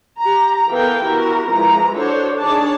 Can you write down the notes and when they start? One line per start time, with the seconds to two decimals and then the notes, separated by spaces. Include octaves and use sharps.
0.19 G4 A#5
0.68 E3 B3 A4 A#4 F5 G5
1.03 B3 E4 F#4 G4 A#4
1.48 E3 F3 G#3 C4 A#5
1.96 D4 F#4 A4 C5 C#5
2.40 D#3 D4 G#4 C#5 D5 A5